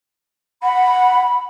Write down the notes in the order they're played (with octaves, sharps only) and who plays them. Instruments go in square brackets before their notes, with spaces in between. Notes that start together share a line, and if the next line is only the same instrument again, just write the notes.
[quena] F#5 [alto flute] B5